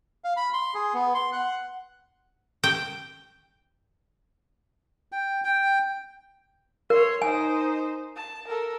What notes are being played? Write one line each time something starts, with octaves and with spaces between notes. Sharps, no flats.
F5
B5
C6
G#4
B3
C6
F#5
G5
G5
G5
A#4 C#5 C6
D#4 C5 G#5
A5
A4 A#4